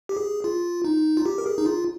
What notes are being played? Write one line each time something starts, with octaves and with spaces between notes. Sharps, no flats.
G4
G#4
F4
D#4
F4
G4
A#4
G#4
D#4
F4